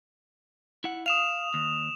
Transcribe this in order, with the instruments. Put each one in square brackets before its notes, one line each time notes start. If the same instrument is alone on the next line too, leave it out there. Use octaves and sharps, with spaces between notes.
[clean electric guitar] E4 F#5
[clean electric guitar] F5 [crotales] D#6 E7 F7
[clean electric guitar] D#2